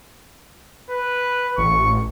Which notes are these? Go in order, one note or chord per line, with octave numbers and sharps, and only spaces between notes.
B4
A1 C#6